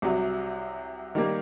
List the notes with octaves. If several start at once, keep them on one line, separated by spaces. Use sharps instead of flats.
C2 C3 F#3
D#3 G3 A#3